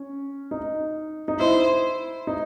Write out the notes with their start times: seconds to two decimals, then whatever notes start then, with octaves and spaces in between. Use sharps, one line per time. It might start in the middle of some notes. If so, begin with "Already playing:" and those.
Already playing: C#4
0.51 D#4
1.28 D#4
1.39 E4 C5
2.27 D#4